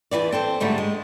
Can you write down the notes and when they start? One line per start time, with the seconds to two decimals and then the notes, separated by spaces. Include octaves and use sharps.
0.11 E2 A#2 E3 D5
0.32 C4 A4 C5
0.60 G#2 D3 F#3 G3 A3
0.78 G#3